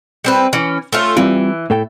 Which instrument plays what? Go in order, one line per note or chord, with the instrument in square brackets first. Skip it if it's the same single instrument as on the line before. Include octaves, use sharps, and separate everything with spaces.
[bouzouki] G3 C4 B4
E3 C#4
A3 C#4 F4
[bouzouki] E3 [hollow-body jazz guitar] G3 C4 F4
[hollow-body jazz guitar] A2 A4 G5